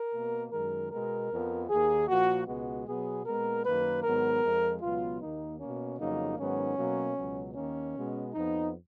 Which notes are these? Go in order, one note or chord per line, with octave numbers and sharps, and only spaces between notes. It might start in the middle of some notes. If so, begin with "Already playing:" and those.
Already playing: A#4
B2 A#3
F#2 D#3 G#3 A#4
B2 G#3 B3 A#4
F2 F3 B3
D#2 D#3 A#3 G#4
A#2 F3 A#3 F#4
C#2 B2 G#3 B3 F#4
B2 F#3 B3 G#4
A#2 G#3 B3 A#4
F#2 D#3 A#3 B4
G#2 D#3 F#3 B3 A#4
F2 F3 G#3
C#2 B2 F#3 B3 F4
D#2 D#3 A#3 D#4
B2 A#3 C#4
F2 C#3 F#3 A#3 D#4
G#2 D#3 F#3 B3 C#4
B2 F#3 A#3
C#2 B2 F#3
D#2 D#3 A#3 C#4
B2 G#3 B3
F2 F3 B3 D#4